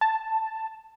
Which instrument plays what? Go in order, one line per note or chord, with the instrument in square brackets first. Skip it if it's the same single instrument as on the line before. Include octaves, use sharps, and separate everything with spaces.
[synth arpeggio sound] A5